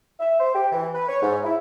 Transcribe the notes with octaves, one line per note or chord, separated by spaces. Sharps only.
E5
C5
G4
E3
B4
C#5
G#2
E4